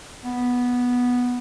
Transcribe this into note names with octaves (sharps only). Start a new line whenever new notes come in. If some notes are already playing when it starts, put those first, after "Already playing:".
B3